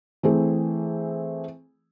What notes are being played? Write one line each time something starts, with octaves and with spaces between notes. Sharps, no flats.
E3 A3 C4 G#4